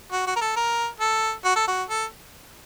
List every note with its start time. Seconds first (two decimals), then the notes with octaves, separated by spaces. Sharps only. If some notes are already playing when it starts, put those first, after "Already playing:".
0.12 F#4
0.27 F#4
0.36 A#4
0.41 A4
0.57 A#4
1.00 A4
1.45 F#4
1.56 A4
1.68 F#4
1.89 A4